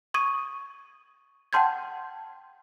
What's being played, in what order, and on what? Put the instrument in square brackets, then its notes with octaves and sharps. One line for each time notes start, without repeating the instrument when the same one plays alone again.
[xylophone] C#6 D#6 G#6 D#7
F#5 G5 A5 C6 G6 G#6